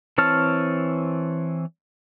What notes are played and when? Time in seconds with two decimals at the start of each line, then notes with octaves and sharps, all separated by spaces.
0.18 E3 C4 C#5 A5 F6